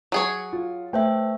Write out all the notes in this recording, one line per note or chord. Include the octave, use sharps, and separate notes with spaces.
F#3 G#4 C#5
F4
A3 B4 C5 E5 G5